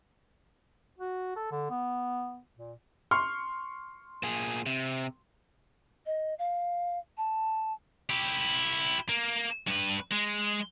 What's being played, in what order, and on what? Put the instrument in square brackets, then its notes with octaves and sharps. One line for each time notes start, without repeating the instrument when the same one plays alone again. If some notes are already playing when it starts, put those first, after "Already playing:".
[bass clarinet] F#4
A4
D3
B3
A#2
[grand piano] C6 C#6 F6
[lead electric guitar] A#2 G#4
C3
[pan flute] D#5
F5
A5
[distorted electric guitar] E4 G4
A#3
G2 B4
G#3